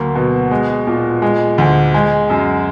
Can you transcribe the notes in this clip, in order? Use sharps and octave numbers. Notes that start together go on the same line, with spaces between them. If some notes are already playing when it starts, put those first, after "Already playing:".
Already playing: D2 F#3 A#3
B2
G#3
A#2
G#3
D2
G#3
F#2